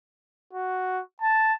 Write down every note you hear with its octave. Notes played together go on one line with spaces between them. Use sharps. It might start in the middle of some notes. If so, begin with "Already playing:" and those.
F#4
A5